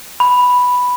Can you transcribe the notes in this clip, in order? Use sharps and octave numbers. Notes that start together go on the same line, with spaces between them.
B5